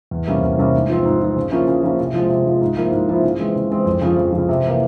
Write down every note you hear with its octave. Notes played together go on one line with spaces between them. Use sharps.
E2
C3 G3 A#3 C#4
E2
C3 G3 A#3 C#4
G#2
F3 C4
G#2
F3 C4
C#3
F3 A#3 C#4 E4
C#3
F3 A#3 C#4 E4
C3
F3 G#3
C3
F3 G#3
G#2
F3 A#3 E4
G#2
F3 A#3 E4
C#3
E3 G#3 C4
C#3
E3 G#3 C4
F2
C#3 F3
F2
C#3 F3
C3
E3 A#3